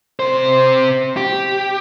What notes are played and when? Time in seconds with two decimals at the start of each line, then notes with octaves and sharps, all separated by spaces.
0.20 C3 C5
1.17 G4